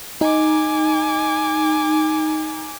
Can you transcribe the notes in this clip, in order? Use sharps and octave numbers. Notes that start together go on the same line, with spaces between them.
D#4 G#5 D6